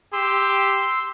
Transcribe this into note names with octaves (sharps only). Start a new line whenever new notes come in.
G4 C6 E6